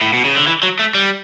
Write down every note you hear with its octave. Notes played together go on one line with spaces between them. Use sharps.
A2
B2
C#3
D3
E3
F#3
A3
G3